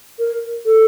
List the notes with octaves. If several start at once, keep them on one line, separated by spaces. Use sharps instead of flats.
A#4
A4